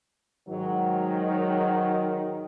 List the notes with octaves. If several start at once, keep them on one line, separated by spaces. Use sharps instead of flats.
G#2 D#3 F#3